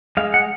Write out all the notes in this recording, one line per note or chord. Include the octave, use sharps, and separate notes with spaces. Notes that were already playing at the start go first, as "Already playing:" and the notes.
G#3 F5
F#5